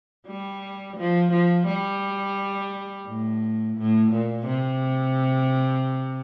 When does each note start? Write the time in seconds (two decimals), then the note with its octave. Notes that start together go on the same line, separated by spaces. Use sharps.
0.27 G3
0.97 F3
1.33 F3
1.67 G3
3.07 A2
3.78 A2
4.12 A#2
4.47 C3